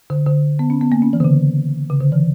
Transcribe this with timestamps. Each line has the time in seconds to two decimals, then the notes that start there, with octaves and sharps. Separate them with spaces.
0.10 D3
0.26 D3
0.59 B3
0.70 C#4
0.81 B3
0.92 A#3
1.02 C#4
1.13 E3
1.20 D3
1.24 C#3
1.90 C#3
2.01 D3
2.12 E3